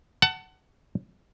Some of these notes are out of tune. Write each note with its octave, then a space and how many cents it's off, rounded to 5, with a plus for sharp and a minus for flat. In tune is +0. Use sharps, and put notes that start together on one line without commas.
F#5 +20 A5 +20